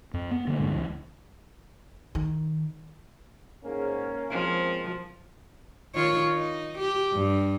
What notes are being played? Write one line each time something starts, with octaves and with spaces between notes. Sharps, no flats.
F2
B3
D3 G3 A#3
A#1 G2 D3 G#3
C#2 E3
D#3
G#2 A#3 C#4
F3 G#3 C4
D#3 F4 C#5
D#4
G4
G2